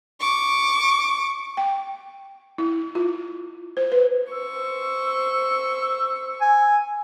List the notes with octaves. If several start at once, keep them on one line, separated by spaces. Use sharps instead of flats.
C#6 D6
G5
E4
F4
C5
B4
C5 C#6 E6
G#5